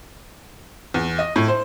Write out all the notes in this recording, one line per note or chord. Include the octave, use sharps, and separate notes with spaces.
E2
D#5
A2
C5